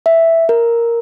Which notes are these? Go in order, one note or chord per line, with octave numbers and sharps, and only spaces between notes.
E5
A#4